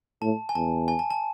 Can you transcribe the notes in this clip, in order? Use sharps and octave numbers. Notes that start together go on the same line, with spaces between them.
A2 A5
G#5
E2 A5
G#5
A5
A5